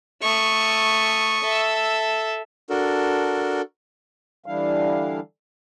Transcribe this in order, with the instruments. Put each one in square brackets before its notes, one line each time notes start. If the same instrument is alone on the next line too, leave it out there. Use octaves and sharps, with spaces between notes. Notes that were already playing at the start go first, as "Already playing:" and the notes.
[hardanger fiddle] A3 [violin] C#6 D#6
[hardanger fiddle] A4 E5
[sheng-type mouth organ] D4 F#4 A4 A#4
[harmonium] D3 E3 G3 D4 E4 F5